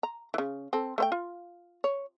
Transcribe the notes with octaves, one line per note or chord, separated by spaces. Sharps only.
A#5
C#3 E3
C4 A4
A3 C5 G5
F4
C#5